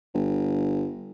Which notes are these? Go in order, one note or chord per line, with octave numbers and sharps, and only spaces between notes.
G1